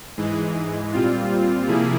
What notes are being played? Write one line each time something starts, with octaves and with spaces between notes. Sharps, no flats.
G#2 E3 G#3
A#2 G3 C4 F4
C3 F3 A#3 E4 G#4